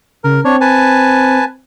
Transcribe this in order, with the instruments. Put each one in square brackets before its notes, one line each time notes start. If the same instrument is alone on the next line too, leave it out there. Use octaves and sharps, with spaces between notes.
[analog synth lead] C#3 [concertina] A#4
[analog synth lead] C4 [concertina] D4 C#5
[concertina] B4 G#5 A5